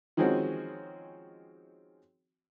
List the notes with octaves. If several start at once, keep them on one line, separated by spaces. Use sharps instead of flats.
D#3 F3 G#3 C4 C#4 F#4